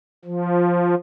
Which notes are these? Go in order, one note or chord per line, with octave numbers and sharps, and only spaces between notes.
F3